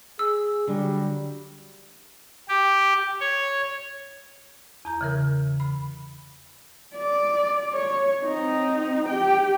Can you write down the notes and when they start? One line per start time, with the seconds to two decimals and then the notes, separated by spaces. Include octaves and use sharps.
0.19 G#4 E6
0.68 D3 F#3 G3
2.48 G4
3.20 C#5
4.85 E2 A#5 G6
5.01 C#3 E3 A#4
5.60 B5
6.95 D5
7.73 C#5
8.24 C4 D#4
9.09 G4 G5